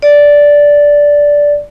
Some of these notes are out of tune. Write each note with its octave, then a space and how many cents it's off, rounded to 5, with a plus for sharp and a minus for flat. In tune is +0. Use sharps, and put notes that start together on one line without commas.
D5 -10